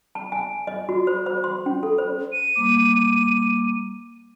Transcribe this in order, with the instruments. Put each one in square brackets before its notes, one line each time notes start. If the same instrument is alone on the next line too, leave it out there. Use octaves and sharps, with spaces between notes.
[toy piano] A5
G#5
D#5
F#4
C5
C5
C6
C#4
A4
C5
[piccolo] D#7
[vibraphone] G3 A#3 D6